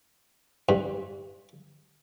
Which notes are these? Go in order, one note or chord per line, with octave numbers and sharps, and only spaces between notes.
G2